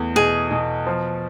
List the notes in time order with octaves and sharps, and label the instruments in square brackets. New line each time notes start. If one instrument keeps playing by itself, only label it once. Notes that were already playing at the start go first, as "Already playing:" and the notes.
Already playing: [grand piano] E2 A3
[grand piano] B2 [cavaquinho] G#4
[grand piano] B2
F3